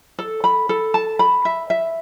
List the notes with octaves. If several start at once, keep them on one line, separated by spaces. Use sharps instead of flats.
A4
B5
A4
A5
B5
E5
E5